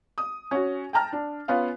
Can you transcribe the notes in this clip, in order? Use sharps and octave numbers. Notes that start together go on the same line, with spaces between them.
D#6
C#4 F#4
G5 A5 A#5 F6
D4
B3 C#4 F4 F5